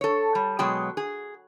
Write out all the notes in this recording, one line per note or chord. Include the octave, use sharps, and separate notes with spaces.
A4 C#5
G3
B2 F#3 G#3 G#4 G5
G#4